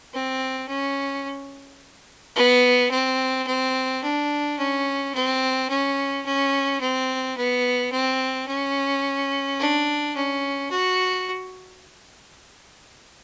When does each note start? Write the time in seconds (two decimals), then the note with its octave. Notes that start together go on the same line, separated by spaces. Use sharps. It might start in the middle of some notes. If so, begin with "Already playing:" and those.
0.14 C4
0.68 C#4
2.36 B3
2.91 C4
3.47 C4
4.03 D4
4.58 C#4
5.15 C4
5.70 C#4
6.26 C#4
6.81 C4
7.37 B3
7.92 C4
8.48 C#4
9.59 D4
10.16 C#4
10.71 F#4